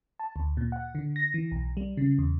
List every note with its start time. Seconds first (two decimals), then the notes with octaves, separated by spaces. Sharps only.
0.19 A5
0.36 D2
0.57 A#2
0.72 F#5
0.95 D3
1.16 A#6
1.34 E3
1.52 B1
1.77 G3
1.97 C#3
2.18 E2